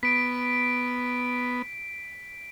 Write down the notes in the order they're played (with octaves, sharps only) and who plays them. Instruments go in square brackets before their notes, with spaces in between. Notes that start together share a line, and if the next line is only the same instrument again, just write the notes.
[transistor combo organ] B3 [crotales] B6 D7